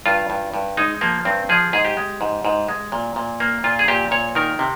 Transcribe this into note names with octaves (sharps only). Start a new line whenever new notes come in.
G2 F4
G2
G2
G#3 D#4
F3 A#3
G2 C4
F3 G#4
G#2 G#4
G4
G#3
G#2
G#2
G#3
A#2
A#2
A#3
A#2 F4
G#4
A#2 G4
A#2 C#5
D#3 A#4
C3